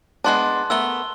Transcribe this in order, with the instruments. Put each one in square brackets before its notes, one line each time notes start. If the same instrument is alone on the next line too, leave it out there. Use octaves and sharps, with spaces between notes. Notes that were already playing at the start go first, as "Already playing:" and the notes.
[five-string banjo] G#3 B3 D4 [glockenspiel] A5 C6 F#6
[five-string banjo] A3 B3 A#4 [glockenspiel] E6 G7